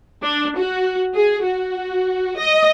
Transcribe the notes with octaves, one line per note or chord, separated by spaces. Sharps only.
D4
F#4
G#4
F#4
D#5